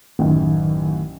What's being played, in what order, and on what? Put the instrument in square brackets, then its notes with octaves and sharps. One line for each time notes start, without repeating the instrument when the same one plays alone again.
[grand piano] A1 F#2 [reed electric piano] D#3